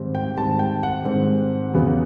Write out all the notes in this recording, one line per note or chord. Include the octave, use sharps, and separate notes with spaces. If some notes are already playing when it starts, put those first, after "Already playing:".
Already playing: G#2 D#3 G3 C4
G5
G#2 D#3 G3 C4 A5
G5
F#5
G#2 D#3 G3 C4
E2 C#3 F#3 B3